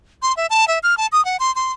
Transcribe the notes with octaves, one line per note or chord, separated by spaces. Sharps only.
C6
E5
A5
E5
F6
A5
D#6
F#5
C6
C6